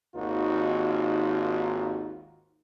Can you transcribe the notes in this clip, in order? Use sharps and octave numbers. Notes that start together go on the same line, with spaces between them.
G#1 D#2 D#3 D#4 F4 F#4